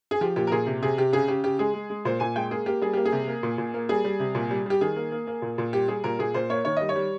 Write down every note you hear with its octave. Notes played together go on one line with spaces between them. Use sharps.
G#4
F3 G4
A#2 G4
A#4
A#2 G#4
C3
C3 G#4
C3 G4
C#3 G#4
C#3 G4
C#3 G4
G#3 G#4
G#3
G#3
A#2 C5
A#2 G#5
G#3 G5
A#3 G#4
A#3 G4
G3 G#4
A#3 G4
G#4
C3
A#3
A#2
A#2
A#3
G3 G#4
G3
C3
A#2
G3
G3 G4
D#3 G#4
A#3
A#3
A#3
A#2
A#2
G3 G4
G3 G#4
A#2 A#4
A#2 G#4
A#2 C5
A#3 C#5
D#3 C#5
G3 D#5
C#5
G3